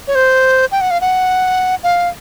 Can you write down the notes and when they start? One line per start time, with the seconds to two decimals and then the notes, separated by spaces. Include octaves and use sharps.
0.08 C#5
0.15 C5
0.72 G5
0.81 F#5
0.91 F5
1.01 F#5
1.83 F5